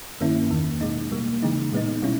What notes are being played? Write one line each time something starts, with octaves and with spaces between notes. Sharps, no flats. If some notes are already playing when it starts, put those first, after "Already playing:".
G2 D#3 A#3 C#4 E4
E2 D#3 A#3
B2 G#3 D#4
B2 G3 A#3
C#3 E3 G#3 D#4
A#2 G#3 B3 D#4
B2 G3 C#4 E4